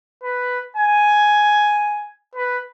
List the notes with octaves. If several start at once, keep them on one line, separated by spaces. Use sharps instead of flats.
B4
G#5
B4